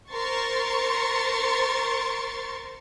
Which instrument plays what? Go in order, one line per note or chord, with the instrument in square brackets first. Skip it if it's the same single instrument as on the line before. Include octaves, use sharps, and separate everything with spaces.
[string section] A#4 C5 C6 C#6 A6